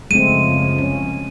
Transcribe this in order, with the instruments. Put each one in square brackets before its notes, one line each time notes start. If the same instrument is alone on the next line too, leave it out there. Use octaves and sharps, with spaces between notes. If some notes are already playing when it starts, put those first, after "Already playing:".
[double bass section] F#2 C#3 F3 [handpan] G#3 A3 C4 [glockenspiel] D#7
[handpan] C#4